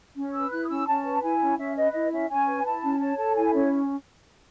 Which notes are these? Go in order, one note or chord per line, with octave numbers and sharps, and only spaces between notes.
C#4
B4 E6
E4 F#6
D#6
C#4 E6
C#4 A5
B4
E4 G#5
C#4
C#4 E5
B4 D#5
E4 D#5
C#4 E5
C#4 G#5
B4
E4 A5
C#4
C#5 A5
A4 A5
E4 G#5
C#4 C#5